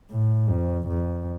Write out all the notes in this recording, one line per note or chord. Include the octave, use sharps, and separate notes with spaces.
A2
F2
F2